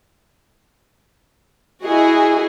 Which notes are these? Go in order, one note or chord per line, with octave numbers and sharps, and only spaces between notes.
E4 F#4 G#4 D#5